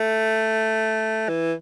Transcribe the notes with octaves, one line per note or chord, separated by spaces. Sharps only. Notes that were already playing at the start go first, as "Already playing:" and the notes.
Already playing: A3
E3